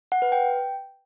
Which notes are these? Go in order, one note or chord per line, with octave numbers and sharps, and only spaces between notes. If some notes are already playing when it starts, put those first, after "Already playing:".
F#5
B4
G5